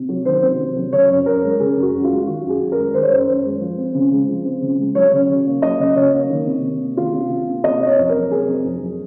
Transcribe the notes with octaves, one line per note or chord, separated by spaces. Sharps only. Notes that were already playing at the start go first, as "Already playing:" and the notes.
Already playing: C3
F#3
D#3 C5
C3
C3
F#3
C#3 C#5
F#2
F#2 A#4
G#3
C#3 G#4
F#2
F#4
F#2
F4
G#3
D#3 F#4
F#2
G#4
F#2
A#4
G#3
D#3 C5
C#5
F#2 C5
F#2
G#3
F3
C4
C#3
G#3
F3
C4
C#3
G#3
F#3 C#5
C#3
C#3
A#3
F#3 D#5
C#3
C#3 C#5
A#3
D#3
C3
C3
A#3
D#3 F4
C3
C3
A#3
C3 D#5
C4
C#5
F2
A#4
F#3
C3 G#4
C4
F2
F#3